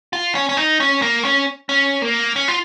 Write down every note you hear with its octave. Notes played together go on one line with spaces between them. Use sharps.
F4
C#4
C#4
D#4
C#4
A#3
C#4
C#4
A#3
C#4
F4